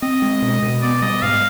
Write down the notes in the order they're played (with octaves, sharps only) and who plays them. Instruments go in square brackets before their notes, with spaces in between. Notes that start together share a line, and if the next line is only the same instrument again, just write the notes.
[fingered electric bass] C4 [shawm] D#5
[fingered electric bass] G#3
B2
B2
[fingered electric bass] B3 [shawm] D5
[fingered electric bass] G3 [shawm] D#5
[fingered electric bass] G#2 [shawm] F5